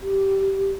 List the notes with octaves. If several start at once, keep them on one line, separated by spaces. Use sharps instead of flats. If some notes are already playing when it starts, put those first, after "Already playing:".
G4